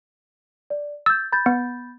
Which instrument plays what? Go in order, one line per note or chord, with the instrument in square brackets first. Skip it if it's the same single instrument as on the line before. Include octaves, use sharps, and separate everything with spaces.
[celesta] D5
[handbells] E6 [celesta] G6 A6
[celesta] B5 G6 A6
[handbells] B3